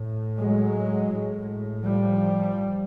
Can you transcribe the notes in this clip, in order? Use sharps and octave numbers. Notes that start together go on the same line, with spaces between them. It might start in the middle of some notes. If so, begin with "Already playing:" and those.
Already playing: A2
F#3 G#3
A2
F3 G3